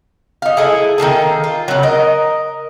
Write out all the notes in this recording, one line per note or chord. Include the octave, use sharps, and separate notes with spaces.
D#4 F5
E4 G#4 A4
D#3 A#3 G#4 A4
F4
C#3 F#3
A#4 D#5